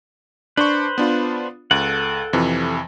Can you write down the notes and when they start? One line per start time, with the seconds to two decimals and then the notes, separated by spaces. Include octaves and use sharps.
0.57 D4 B4 C5 C#6
0.98 B3 D4 F4
1.71 C#2 A4 F#5
2.33 F2 C3 E3